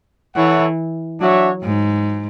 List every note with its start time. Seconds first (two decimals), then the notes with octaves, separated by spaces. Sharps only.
0.35 E3 E4 A4 C#5 F#5
1.21 F#3 D4 F#4 C#5 E5
1.63 G#2